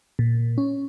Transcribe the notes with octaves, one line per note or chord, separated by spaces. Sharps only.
A#2
C#4